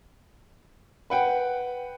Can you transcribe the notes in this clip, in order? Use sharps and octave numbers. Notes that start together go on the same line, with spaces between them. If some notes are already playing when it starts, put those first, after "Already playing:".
B4 F#5 G5